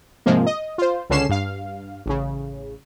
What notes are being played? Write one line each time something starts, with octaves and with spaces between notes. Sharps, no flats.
G#2 C3 F3 G#3 A#3
D#5
F4 C5
C#2 D3 C#4 C7 E7
G2 F5
A1 C#3